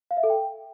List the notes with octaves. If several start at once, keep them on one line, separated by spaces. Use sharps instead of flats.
F5
E5
A4
G5